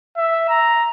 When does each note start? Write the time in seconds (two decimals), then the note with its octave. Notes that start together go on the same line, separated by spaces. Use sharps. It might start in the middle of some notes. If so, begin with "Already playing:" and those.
0.17 E5
0.49 A#5